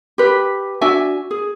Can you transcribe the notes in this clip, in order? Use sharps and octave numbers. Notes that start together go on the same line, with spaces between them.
G4 B4
D4 F#4 E5 G#5
G#4